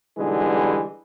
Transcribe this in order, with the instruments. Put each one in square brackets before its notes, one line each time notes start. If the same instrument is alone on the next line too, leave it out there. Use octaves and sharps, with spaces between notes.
[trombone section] B1 D3 E3 G3 G#3